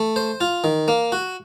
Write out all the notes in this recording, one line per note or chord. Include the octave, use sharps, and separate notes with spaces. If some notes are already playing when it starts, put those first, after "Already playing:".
Already playing: A3
C5
F4
D#3
A#3
F#4